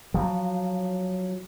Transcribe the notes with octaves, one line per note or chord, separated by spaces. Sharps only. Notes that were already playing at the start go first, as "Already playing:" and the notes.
F3 F#3